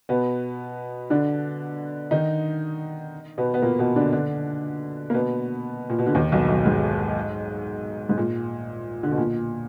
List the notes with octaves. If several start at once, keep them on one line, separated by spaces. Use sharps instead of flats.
B2 B3
D3 D4
D#3 D#4
B2 B3
B3
A#2 A#3
B2 B3
D3 D4
D3 D4
A#3
B2 B3
A#2
B2
D3
D#2 D#3
B1 B2
B1 B2
G#2
G#2
A#2
D3
B2
A#2